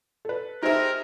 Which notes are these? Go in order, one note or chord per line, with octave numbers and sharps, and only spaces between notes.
A4 B4
D#4 G4 G#4 A#4 C5 E5